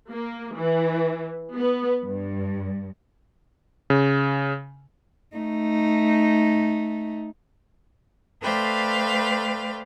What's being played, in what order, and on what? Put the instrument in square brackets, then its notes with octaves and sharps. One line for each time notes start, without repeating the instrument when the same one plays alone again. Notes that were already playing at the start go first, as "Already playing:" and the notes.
[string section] A#3
E3
B3
G2
[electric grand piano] C#3
[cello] A3 D#4
[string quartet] A3 B4 C5 D5 F5 G5